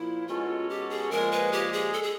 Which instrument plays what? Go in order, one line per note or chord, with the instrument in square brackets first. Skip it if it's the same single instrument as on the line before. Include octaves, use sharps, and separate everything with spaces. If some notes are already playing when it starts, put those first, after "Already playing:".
Already playing: [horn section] A#2 F3 [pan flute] E4
[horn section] B2 G#3 C#4 F#4 A4 [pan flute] F4
[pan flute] G4
G#4
[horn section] A#2 F3 G#3 [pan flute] A#4
[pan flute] B4
G4
G#4
A4
G#4